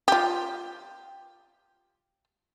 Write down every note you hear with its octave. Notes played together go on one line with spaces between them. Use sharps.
F4 G4